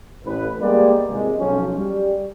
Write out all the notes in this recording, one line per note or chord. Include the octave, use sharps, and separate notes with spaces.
A1 B4
G3 G#3 A#3 B3 G4 D5
G#1 E2 C3 G#3
B1 F3 F#3 C#4
G3